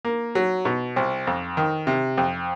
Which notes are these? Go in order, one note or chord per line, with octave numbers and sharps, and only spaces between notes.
A#3
F#3
B2
C2
F2
D#3
C3
F2